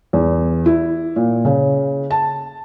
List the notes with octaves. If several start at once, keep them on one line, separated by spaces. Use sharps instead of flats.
E2
E4
A#2
C#3
A5